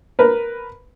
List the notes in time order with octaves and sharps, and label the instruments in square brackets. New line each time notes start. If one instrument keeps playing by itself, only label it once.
[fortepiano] A#4 B4